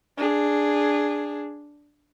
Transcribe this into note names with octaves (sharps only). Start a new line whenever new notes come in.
D4 G#4